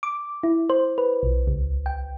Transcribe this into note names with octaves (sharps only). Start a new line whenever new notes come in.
D6
E4
C5
B4
B1
C#2
G5